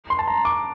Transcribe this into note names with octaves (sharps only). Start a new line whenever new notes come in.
C6
A5
A#5
D6